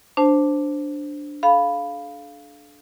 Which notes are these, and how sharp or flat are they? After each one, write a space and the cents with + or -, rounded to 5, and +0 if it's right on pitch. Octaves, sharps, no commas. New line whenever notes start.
D4 +0 C5 +0 A5 +0
A4 -40 F5 +0 B5 +0